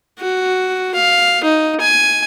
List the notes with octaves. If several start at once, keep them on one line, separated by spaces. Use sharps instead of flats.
F#4
F5
D#4
G#5